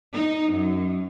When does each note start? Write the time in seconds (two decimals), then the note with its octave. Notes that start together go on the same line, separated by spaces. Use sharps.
0.14 D#4
0.53 F#2